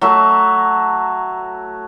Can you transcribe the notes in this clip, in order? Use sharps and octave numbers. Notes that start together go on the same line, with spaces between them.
F#3 A3 E5